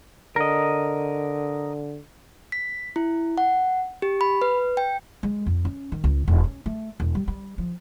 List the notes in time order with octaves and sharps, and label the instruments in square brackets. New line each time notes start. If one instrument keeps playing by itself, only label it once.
[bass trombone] D3 [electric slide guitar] A#4 D#5
[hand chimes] B6
E4
F#5
G4
B5
B4
G5
[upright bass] G#3
F2
C#4
D#3
C#2
E1
C#4
A3
E1
G3
G3
F3